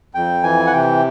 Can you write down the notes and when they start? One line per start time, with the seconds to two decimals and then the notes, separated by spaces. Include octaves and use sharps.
0.15 F2 G5
0.43 E3 G#5
0.67 F#5
0.73 C3 G5